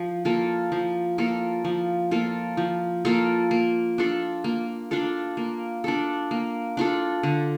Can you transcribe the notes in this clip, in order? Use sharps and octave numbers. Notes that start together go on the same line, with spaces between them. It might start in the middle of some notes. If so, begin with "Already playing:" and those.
Already playing: F3
A#3 F4 A4
F3
A#3 F4 A4
F3
A#3 F4 A4
F3
A#3 F4 A4
A#3
D4 F4 A4
A#3
D4 F4 A4
A#3
D4 F4 A4
A#3
D4 F4 A4
D3